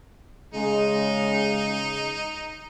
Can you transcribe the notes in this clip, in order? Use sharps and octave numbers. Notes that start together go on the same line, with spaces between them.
C#3 G#3 D#4